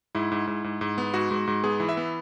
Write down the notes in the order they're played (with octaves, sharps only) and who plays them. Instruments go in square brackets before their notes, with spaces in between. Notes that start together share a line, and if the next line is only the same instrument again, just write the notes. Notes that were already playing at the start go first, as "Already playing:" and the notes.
[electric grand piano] G#2 E4
G#2
G#2
G#2
G#2
B3
G#2 F#4
G#2
G#2
B3 G#4
E3
E5
B3